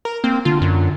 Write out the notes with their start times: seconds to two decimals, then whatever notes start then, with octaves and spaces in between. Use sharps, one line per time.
0.05 A#4
0.24 A#3 C4
0.45 D3 F4
0.62 F#2